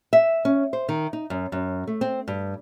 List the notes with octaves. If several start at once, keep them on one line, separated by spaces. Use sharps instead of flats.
E5
C#4
C5
D#3
D#4
F#2
F#2
A3
C4
G2